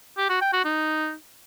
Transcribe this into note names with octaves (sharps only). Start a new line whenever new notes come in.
G4
F#4
G5
F#4
D#4